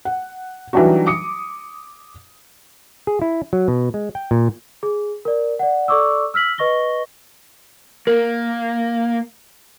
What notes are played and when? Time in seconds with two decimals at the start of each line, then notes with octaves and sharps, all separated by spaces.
0.05 F#5
0.73 E3 F#3 G3 D4 D#4 F#4
1.07 D6 D#6 C#7
3.07 G#4
3.22 E4
3.53 F#3
3.68 B2
3.94 G#3
4.15 G5
4.31 A#2
4.83 G#4
5.25 A#4 D5
5.59 D5 F#5
5.88 A4 D5 C#6 D6 E6
6.34 E6 F6 B6 F#7
6.58 B4 D#5 C#6 A#6 G7
8.07 A#3 A#4